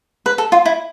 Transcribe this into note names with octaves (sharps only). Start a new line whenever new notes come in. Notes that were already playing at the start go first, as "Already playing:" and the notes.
B4
A4
F4
E4